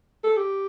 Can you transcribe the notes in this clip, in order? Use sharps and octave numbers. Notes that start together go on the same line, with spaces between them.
A4
G4